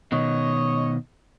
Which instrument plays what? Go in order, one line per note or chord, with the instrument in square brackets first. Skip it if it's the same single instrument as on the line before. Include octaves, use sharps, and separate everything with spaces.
[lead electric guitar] B2 D#3 [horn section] C#5 D#5